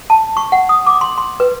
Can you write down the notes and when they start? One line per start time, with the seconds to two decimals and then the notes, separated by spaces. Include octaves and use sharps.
0.10 A5
0.37 C#6
0.52 F#5
0.69 D#6
0.87 D6
1.01 C6
1.18 C6
1.40 B4